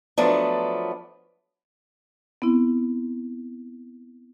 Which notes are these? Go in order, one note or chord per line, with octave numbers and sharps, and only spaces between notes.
F3 F#3 A3 B3 D4
B3 C4 E4